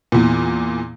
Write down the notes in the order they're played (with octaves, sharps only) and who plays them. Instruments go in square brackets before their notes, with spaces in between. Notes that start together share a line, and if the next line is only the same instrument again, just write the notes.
[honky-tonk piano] E2 A#2